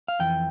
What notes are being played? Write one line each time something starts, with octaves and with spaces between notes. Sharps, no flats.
F5
F2 E3 G5